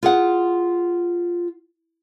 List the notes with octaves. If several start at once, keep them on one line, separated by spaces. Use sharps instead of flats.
F4 G#4 F#5